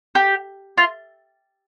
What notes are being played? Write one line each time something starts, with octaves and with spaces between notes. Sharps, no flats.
G4
F4